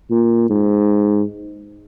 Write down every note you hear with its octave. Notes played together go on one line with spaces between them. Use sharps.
A#2
G#2